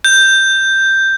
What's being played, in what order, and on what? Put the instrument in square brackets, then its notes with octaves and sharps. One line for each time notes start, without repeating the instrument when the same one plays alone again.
[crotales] G6